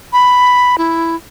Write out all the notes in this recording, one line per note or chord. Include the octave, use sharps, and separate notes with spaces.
B5
E4